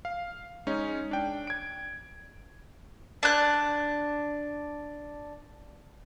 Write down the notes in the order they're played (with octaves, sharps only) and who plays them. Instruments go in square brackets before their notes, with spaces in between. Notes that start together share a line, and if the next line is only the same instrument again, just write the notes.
[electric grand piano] F5
G#3 C#4 D#4
D4 G5
G#6 D7
[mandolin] D4 F#6